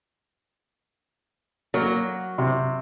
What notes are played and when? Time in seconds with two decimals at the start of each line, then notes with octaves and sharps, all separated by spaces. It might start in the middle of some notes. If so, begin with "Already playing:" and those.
1.74 F#3 A#3
2.38 C3